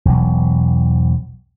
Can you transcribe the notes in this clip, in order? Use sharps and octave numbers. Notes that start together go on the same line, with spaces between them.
E1 B1